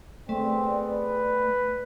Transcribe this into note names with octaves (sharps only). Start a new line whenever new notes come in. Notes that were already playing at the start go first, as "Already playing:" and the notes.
A3 B3 C4 G#4 D5
B4